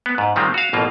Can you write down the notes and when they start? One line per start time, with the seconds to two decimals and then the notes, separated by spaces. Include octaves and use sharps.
0.06 B3
0.18 G#2
0.36 A#2 D#3 G3 G#3 C4
0.54 F#4 F5
0.73 A1 B2 A#3 F4